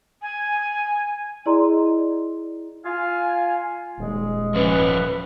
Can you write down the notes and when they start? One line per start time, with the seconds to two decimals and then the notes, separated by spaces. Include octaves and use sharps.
0.21 G#5
1.46 E4 G#4 D5 D#5 A#5 C6
2.85 F4 F5 G#5
3.98 D#1 G#3
4.54 F3 C#4 B4 C#5